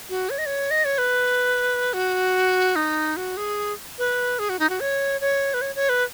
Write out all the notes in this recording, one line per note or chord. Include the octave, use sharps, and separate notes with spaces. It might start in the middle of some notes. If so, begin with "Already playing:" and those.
F#4
C#5
D#5
C#5
D#5
C#5
B4
F#4
D#4
F#4
G#4
B4
G#4
F#4
D#4
F#4
C#5
C#5
B4
C#5
C#5
B4